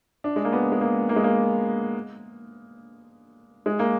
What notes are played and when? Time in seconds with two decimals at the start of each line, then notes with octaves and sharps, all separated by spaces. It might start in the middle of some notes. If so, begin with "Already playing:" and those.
0.24 D4
0.36 G#3
0.45 A#3
0.53 B3
0.72 G#3
0.81 A#3
1.09 A#3
1.16 G#3
1.24 A#3
3.66 G#3
3.79 A#3